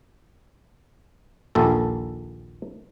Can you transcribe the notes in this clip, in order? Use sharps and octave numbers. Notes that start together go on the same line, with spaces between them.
A#1 D#2 A4